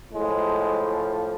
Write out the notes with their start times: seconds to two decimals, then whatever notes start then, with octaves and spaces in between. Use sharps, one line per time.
0.13 A2 F3 G#3